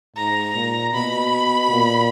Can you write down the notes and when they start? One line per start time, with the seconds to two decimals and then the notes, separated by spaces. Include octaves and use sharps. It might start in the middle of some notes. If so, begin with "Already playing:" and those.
0.16 G#2 A#5
0.55 A#2
0.94 B2 B5
1.71 A#2